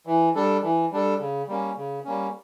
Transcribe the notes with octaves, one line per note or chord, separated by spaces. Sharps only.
E3
G3 D4 A4
E3
G3 D4 A4
C#3
G3 A#3 C#4
C#3
G3 A#3 C#4